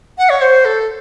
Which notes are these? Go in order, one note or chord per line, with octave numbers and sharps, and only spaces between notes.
F#5
C#5
C5
A4